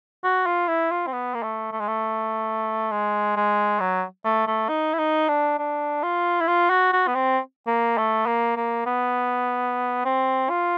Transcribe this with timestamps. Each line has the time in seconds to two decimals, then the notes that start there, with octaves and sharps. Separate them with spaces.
0.24 F#4
0.46 F4
0.68 E4
0.91 F4
1.07 C4
1.13 B3
1.34 A#3
1.43 A3
1.72 A3
1.80 G#3
1.88 A3
2.91 G#3
3.36 G#3
3.80 F#3
4.25 A3
4.47 A3
4.69 D#4
4.94 E4
4.99 D#4
5.29 D4
5.59 D4
6.03 F4
6.41 E4
6.48 F4
6.70 F#4
6.93 F#4
7.07 B3
7.15 C4
7.67 A#3
7.97 A3
8.26 A#3
8.57 A#3
8.86 B3
10.05 C4
10.50 F4